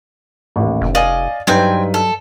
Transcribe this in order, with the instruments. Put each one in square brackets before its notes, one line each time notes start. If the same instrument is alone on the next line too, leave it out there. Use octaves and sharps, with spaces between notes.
[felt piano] A1 D#2
[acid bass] F1
[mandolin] D5 D#5 [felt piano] F5 G#5
[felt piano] G2 D#4 B4 [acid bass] F#3 [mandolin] C4 G5 G#5
[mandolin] A4